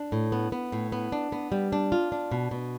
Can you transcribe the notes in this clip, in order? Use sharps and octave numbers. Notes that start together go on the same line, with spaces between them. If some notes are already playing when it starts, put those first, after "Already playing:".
Already playing: D4
A2
B3
B3
A2
B3
D4
B3
G3
D4
F4
D4
B2
B2